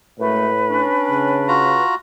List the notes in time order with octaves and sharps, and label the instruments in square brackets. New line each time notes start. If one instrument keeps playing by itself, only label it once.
[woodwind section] F#2 G#3 A3 [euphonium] A2 [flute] B4
[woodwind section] C#4 D4
[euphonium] C#3
[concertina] F4 F#4 A#5